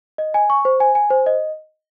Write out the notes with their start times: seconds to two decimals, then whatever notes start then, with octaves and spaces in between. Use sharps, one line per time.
0.18 D#5
0.34 G#5
0.50 C#6
0.65 C5
0.80 G#5
0.95 G#5
1.10 C5
1.26 D#5